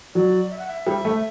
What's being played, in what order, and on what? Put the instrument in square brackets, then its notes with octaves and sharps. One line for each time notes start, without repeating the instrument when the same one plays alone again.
[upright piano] F#3 [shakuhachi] D5
[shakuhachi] E5
F#5
E5
[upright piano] G3
A3